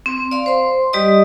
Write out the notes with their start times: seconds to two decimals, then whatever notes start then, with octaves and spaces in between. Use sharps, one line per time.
0.06 C4
0.31 D5 F5 C6
0.46 C5 C6
0.93 G3 G4 D5 D#5 D#6